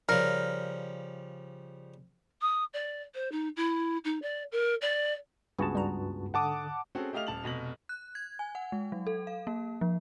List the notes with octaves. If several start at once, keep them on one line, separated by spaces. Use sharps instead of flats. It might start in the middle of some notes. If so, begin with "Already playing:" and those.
C#3 F3 G3 A#4
D#6
D5
C5
D#4
E4
D#4
D5
A#4
D5
C#2 G2 B3 F#4 G#4 A5
G3 A#5
G#2 D3 F#5 A5 D6 D#6
C4 C#4 F#4 G#4 A4
A3 G4 D#5 F5 F6 F7
D#1 A5 F#7
F1 B2 A#6 F#7
F#6
G#6
G#5
F#5
G#3
F#3
A4
F5
A#3
F3